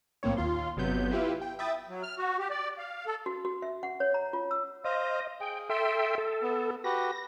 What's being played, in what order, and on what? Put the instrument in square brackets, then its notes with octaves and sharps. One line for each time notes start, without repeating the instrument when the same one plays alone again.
[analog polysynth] B1 A2 A#3 C4 C#5
D#2 F4 C6
G1 C3 F#3 B3 G6
E4 F4 G4 B4 E5 F5
G5
E5 G5 B5 D#6 A6
[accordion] F#3
F6
F#4
G4
D5
F5
A4
[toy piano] F#4
F#4
E5
F#5
C#5
A#5
F4
E6
[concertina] C5 F5 [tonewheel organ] D#5
[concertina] G#4 [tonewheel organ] G5
[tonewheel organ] A4 E5 G5 [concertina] C6
[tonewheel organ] A4
[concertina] B3
[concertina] F#4 G4 B4 [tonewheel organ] A#6